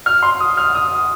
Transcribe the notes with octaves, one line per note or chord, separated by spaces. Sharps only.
F6
C6
D#6
F6
D#6